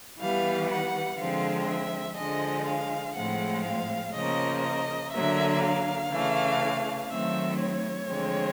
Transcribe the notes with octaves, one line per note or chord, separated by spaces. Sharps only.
E3 G3 B3 F5
F#5
D3 F3 G#3 C4 F5
E5
D3 F3 G#3 D#5
F5
A2 F3 G#3 C4 F#5
F5
C#3 F3 A#3 D#5
D#5
D3 F#3 A#3 E5
F5
C#3 E3 A3
D#3 F#3 A3 C4 E5
C#5
D3 F3 G#3 C4